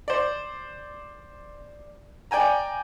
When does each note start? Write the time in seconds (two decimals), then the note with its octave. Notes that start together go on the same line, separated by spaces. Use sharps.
0.08 C5 D5
2.31 D5 G5 G#5 A#5